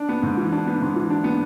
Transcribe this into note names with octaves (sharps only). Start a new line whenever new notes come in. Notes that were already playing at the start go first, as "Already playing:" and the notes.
Already playing: D4 D5
B3
G#2
E3
D4
B3
G#2
E3
D4
B3